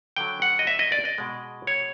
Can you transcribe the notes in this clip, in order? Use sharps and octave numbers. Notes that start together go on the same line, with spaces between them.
D3 F#3 G5
F#5
D#5
E5
D#5
D5
D#5
B2 G#3
C#5